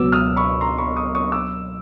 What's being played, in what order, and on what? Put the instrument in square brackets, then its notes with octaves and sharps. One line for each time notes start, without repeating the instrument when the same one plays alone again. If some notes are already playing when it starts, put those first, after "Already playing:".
Already playing: [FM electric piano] C#2 B2 F#3 B3 [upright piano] D6 E6
[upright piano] D#6 F6
B5 C#6
A#5 C6
B5 C#6
C#6 D#6
C#6 D#6
D6 E6